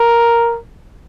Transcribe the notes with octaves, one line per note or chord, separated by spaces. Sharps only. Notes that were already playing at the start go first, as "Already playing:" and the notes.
Already playing: A#4